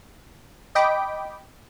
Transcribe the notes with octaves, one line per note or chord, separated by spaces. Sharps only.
D#5 G5 B5 D6